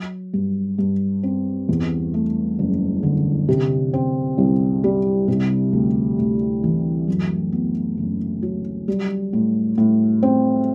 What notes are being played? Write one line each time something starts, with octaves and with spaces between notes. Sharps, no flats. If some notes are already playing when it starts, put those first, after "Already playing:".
Already playing: F#3
G2
G2
C4
E2
A3
F#1
D3
C3
C4
C2
G3
C3
D2
D2
E3
F#2
B3
F#1
F#3
G3
A2
A2
C4